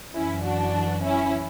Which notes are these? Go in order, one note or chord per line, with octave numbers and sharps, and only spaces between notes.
F#2 E3 C#4 E4
D4 F#4
C#4 E4